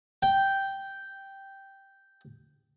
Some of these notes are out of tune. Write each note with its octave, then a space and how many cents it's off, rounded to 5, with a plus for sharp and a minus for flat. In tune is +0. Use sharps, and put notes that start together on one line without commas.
G5 -5